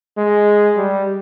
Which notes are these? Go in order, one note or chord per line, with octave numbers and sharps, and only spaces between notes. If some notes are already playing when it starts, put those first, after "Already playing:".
G#3
G3